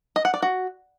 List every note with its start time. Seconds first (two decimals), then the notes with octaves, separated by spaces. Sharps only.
0.16 D#5
0.25 F#5
0.34 D5
0.42 F#4